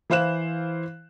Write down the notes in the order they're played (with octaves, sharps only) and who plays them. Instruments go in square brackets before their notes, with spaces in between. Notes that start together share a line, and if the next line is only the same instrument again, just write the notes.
[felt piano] E3 E4 C5 F5 F#6 E7